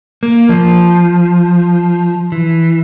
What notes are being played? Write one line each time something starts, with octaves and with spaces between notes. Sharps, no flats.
A#3
F3
E3